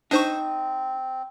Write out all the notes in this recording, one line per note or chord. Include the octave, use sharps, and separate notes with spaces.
C4 D4 D#4 C5 C#6